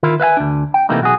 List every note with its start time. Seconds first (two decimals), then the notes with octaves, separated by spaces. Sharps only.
0.03 D#3 E4 F4 A#4
0.20 B4 E5 F5 G#5
0.37 D2 D4
0.74 G5
0.89 C3 E3 A3 A#3 D#4
1.01 B1 F#4 G#4